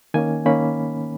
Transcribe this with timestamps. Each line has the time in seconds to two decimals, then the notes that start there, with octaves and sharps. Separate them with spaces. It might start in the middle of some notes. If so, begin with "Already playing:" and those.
0.14 D#3 A#3 C#4 G#5
0.45 D#3 A#3 C#4 B5